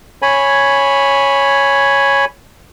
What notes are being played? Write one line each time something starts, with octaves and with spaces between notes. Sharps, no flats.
C#5 G#5 B5